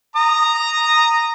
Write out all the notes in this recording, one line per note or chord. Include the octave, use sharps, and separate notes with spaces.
A#5 D#6